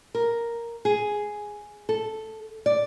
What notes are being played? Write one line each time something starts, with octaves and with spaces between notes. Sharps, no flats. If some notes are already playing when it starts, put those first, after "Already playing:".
A#4
G#4
A4
D5